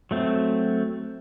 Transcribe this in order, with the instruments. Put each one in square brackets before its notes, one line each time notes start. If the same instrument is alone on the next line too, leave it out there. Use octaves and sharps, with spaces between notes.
[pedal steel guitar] F#3 A3 C4